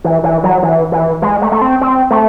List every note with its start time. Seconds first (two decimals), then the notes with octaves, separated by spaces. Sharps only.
0.04 E3
0.24 E3
0.44 F#3
0.63 E3
0.92 E3
1.22 G#3
1.42 A3
1.52 A3
1.62 C4
1.81 C4
2.11 A3